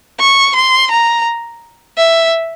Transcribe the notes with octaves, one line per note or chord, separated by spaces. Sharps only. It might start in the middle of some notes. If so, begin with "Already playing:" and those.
C#6
C6
A#5
E5